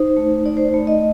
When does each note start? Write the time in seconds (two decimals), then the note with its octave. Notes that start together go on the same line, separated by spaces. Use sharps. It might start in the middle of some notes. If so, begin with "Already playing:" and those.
Already playing: D#4 C5
0.17 A3
0.45 D#4 D5
0.57 C5
0.69 D5
0.74 A3
0.87 D#5